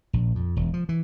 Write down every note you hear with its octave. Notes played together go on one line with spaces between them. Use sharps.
A#1
F2
E1
F3
E3